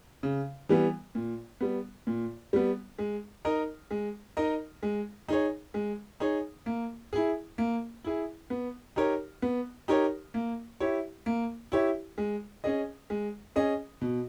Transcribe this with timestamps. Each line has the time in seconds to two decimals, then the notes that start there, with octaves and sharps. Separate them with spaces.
0.23 C#3
0.69 E3 G3 B3
1.15 A#2
1.61 G3 B3
2.07 A#2
2.53 G3 B3
2.99 G#3
3.45 D#4 A#4 D#5
3.91 G#3
4.37 D#4 A#4 D#5
4.83 G#3
5.28 D#4 G#4 C#5
5.74 G#3
6.20 D#4 G#4 C#5
6.66 A#3
7.13 E4 G#4
7.58 A#3
8.04 E4 G#4
8.50 B3
8.96 D#4 G4 A#4 C#5
9.42 B3
9.88 D#4 G4 A#4 C#5
10.34 A#3
10.80 E4 G4 C#5
11.26 A#3
11.72 E4 G4 C#5
12.18 G#3
12.64 C#4 G#4 D#5
13.10 G#3
13.56 C#4 G#4 D#5
14.01 B2